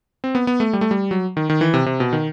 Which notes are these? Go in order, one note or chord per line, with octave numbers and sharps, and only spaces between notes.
C4
B3
B3
A3
G3
A3
G3
F#3
D#3
D#3
E3
C3
C3
B2
D#3